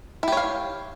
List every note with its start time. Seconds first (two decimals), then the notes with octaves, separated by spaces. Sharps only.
0.23 E4
0.28 G4
0.32 C#5
0.37 F5